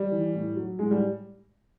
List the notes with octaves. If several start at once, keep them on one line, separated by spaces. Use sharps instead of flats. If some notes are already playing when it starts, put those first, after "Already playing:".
Already playing: G3
E3
A2
F#3
A2 G#3
G3